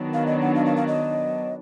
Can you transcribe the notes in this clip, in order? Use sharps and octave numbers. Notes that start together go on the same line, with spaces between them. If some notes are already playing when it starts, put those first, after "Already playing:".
Already playing: D#3 F#3 B3 D4
F5
D#5
F#5
F5
F5
F5
D#5